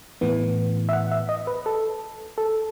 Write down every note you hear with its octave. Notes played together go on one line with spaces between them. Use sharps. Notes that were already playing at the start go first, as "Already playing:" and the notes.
A2 E3 B3
E5
F#5
E5
D#5
B4
A4
A4